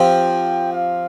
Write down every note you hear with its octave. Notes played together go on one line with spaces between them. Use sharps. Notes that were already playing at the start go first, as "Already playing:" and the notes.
Already playing: F3 C4 G4 G5
F5